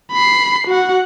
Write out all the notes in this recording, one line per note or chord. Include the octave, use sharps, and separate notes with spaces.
B5 C7
F#4 F#5